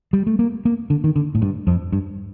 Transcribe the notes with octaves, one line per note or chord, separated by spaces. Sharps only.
G3
A3
A#3
A#3
D3
D#3
D3
A2
G2
F2
G2